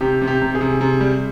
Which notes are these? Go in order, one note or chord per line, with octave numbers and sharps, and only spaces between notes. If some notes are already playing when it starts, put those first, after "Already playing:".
C3 G4
C3
G4
C3
G#4
C3
C3
G3